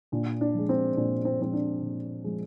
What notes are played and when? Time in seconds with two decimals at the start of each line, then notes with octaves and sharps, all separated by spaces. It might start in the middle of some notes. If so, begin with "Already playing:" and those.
0.12 A#2 D4
0.41 D4
0.55 F3 G#3
0.69 C4
0.97 A#2 D4
1.25 C4
1.40 F3 G#3 C4
1.53 D4
1.82 A#2
2.24 F3 G#3